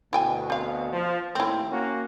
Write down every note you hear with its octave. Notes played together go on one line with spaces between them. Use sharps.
D2 B2 E4 G5 G#5
C4 F5
F3
D#2 A2 C4 E4
A#3 C#4 F#4